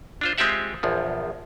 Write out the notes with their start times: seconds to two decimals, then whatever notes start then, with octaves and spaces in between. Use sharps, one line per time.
0.21 D4 F4 C5
0.38 G#3 C4 F4 G4 E5 F#5
0.83 A#1 E2 F3